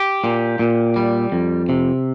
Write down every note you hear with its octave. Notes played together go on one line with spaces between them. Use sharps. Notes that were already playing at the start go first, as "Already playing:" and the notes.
Already playing: G4
A#2
A#2
G3
F2
C3